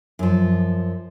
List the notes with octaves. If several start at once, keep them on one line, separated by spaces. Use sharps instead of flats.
F#2 F3